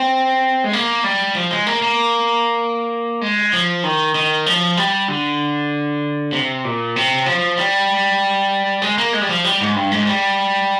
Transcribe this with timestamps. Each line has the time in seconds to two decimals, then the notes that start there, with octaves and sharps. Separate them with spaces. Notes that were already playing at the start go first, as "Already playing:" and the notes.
Already playing: C4
0.64 G#3
0.73 A#3
1.04 G3
1.35 F3
1.51 G#3
1.67 A#3
1.82 A#3
3.21 G#3
3.53 F3
3.83 D#3
4.15 D#3
4.46 F3
4.77 G3
5.08 D3
6.33 C3
6.65 A#2
6.96 C3
7.26 F3
7.57 G3
8.82 G#3
8.98 A#3
9.13 G#3
9.21 G3
9.29 F3
9.44 G3
9.61 G#2
9.75 G2
9.91 G#2
10.07 G3